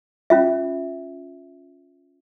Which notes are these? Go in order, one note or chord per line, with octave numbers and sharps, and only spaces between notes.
C#4 F4 E5